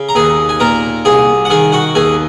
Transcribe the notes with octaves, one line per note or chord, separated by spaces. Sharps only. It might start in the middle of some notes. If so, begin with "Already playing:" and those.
Already playing: C#3
A#5
D#2 G#4 G#5
G#5
A#2 A#4 A#5
C2 G#4 G#5
F#5
D#3 G#4 G#5
F#4 F#5
D#2 G#4 G#5